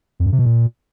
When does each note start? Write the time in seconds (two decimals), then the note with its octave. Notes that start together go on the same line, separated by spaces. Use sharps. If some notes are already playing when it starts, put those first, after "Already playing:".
0.20 F2
0.26 F#2
0.32 C3
0.39 B2
0.45 A#2